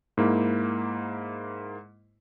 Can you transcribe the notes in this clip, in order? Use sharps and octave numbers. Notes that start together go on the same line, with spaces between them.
G#2 A#3 E4